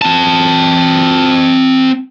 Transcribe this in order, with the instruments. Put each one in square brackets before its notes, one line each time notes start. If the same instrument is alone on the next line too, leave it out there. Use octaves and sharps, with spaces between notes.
[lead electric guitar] C4 A5